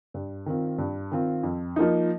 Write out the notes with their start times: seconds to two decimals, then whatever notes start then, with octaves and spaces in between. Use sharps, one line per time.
0.14 G2
0.46 D#3 C4 F4
0.78 G2
1.12 D#3 C4 F4
1.43 F2
1.76 F3 A#3 D#4